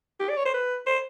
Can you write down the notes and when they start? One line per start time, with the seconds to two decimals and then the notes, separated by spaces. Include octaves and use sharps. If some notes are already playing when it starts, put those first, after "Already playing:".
0.20 G4
0.29 D5
0.37 C#5
0.45 C5
0.54 B4
0.87 C5